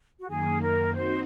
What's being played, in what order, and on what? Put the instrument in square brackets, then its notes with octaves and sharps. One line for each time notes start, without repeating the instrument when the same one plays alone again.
[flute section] F#4
[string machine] F#2 D#3 A#3 [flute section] G#4
[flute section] A#4
[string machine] C4 D#4 F#4 [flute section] C5